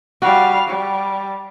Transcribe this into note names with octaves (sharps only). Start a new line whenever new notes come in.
G3 F#4 F5
G3